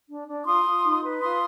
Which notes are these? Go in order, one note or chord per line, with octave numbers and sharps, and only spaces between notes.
D4
D4
D6
F4 C6 D#6
F4
D#4
B4
F4 C6 D#6